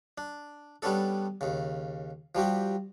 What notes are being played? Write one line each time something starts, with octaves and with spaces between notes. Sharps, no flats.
D4
G3 B3 C#4 D4 A4
D#2 C#3
F3 G3 F#4 G4